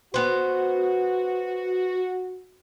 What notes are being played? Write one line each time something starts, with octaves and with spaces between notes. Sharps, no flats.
B3 F#4 C5